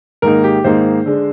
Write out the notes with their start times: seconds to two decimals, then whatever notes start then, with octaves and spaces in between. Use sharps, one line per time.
0.22 G#2 D#3 A#3 D#4 A#4
0.44 G4
0.64 G#2 D#3 A#3 D#4 C5
1.06 D3 G#3 D4